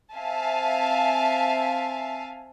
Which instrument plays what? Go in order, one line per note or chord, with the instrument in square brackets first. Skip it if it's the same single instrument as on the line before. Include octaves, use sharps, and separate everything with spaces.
[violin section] C4 E5 F5 G#5 A5